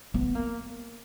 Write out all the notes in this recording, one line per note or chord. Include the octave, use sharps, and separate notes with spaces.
B3
A#3